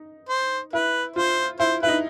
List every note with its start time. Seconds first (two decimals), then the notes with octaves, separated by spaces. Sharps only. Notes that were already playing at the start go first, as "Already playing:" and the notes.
Already playing: D#4
0.29 C5
0.73 E4 B4
1.16 F4 C5
1.60 E4 C5
1.82 E4 B4
1.88 D#4